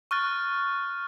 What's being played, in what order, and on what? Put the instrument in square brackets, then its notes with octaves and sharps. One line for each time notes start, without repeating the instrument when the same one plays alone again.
[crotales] C#6 F6 F#6 A6